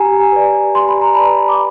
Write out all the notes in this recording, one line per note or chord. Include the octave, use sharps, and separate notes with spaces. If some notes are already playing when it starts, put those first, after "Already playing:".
Already playing: G4 G#5 A#5
B4 D5
G4 C6
B5
A#5
B4 D5 A5 B5
D6